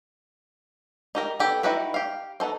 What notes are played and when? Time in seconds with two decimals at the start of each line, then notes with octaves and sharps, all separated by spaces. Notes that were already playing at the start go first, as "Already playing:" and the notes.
1.15 D#4 G4 A#4
1.40 B3 G4 A4
1.63 D#4 E4 F#4 G4 B4
1.94 G4 F5
2.40 B3 D#4 A4 C5